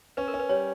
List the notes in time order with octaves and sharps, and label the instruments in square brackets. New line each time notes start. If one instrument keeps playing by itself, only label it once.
[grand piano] C#4 [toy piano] B4
[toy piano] A#4
[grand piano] C#4
[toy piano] B4
[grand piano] G3 [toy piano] C#5